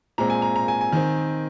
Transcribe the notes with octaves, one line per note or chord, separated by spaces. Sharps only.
A#2 G#3 C4 A#5
G#5
A#5
A#5
G#5
G#5
D#3 C4